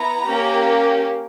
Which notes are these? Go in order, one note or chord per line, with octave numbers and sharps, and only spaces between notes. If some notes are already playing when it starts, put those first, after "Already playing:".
Already playing: B3 E4 A#5
A#3 C#4 G4